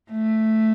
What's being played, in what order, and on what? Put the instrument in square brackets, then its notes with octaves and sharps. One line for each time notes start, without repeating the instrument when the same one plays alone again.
[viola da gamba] A3